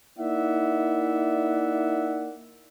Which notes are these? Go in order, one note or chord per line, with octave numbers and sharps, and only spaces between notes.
A#3 D#4 E4 D5 E5 F#5